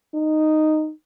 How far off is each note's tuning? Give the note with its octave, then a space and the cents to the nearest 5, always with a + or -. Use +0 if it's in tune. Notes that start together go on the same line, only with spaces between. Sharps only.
D#4 -5